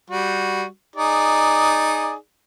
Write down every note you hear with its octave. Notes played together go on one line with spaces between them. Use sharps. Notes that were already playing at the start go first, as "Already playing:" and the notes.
G3 F#4
D#4 G#4 D5